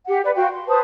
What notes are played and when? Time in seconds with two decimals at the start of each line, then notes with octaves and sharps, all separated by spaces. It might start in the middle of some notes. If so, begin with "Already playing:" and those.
0.07 G4 F#5
0.24 B4 D5
0.36 F#4 F5 G5 C6
0.53 C6
0.68 B4 C5 A5 D#6